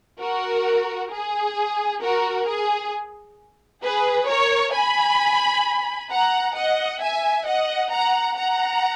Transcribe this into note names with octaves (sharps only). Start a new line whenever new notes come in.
F#4 A#4
G#4
F#4 A#4
G#4
G#4 B4
A#4 C#5
G#5 B5
F#5 A#5
D#5 F#5
E5 G#5
D#5 F#5
F#5 A#5
F#5 A#5